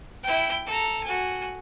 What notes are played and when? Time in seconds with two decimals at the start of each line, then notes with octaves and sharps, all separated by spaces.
0.23 E4 G5
0.66 A4 A#5
1.03 F#4 G#5